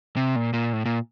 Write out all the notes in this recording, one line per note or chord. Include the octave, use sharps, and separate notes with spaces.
C3
A#2
A#2
A2
A#2